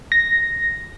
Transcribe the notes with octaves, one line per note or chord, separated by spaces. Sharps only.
A#6